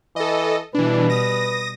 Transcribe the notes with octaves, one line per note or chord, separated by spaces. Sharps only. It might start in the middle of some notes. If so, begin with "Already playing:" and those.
E3 A4 D#5
B2 E3 G3 D4 B4
D#6 A#6